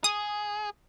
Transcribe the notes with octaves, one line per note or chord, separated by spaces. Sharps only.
G#4 D#6